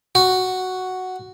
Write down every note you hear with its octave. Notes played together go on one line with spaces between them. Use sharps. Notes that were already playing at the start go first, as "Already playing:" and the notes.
F#4